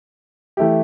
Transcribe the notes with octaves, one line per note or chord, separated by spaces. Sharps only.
E3 A3 E4 G4